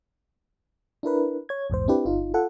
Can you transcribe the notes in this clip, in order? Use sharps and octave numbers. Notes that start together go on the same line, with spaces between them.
D4 E4 A#4 B4
C#5 G#6
A#1 E2 G#2 C5
C4 D4 E4 G4 B4
G1 D#4 F4
F4 A4 F#5